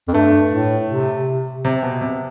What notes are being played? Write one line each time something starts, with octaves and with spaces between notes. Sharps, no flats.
F2
G2 A3
A2
C3
C3
C3
B2
C3